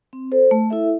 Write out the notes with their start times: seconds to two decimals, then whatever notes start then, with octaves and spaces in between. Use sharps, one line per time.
0.13 C4
0.32 A4 C5
0.51 A3
0.70 E4 A4 E5